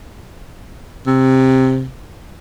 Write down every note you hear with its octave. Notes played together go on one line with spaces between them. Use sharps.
C3